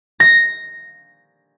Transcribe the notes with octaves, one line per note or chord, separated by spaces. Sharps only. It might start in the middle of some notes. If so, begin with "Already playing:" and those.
A#6